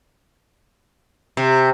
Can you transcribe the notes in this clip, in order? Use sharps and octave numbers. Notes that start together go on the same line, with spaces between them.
C3